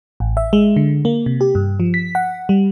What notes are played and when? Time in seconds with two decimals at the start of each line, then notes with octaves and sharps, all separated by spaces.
0.20 A1
0.37 E5
0.53 G#3
0.76 D3
1.05 A#3
1.26 C3
1.41 G4
1.55 G2
1.80 F3
1.94 B6
2.15 F#5
2.49 G3